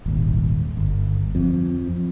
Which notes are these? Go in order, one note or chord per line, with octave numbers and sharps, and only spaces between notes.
D#1 G#1
G1
F2